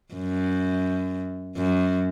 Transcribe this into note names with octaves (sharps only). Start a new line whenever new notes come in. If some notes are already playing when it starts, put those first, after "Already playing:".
F#2
F#2